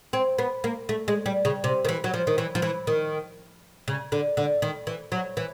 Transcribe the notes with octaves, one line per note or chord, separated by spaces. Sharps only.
C4
B3
A#3
A3
G#3
G3
C#3
C3
D#3
E3
F#3
F3
D#3
E3
F3
E3
D#3
C#3
D3
D3
D#3
E3
F#3
E3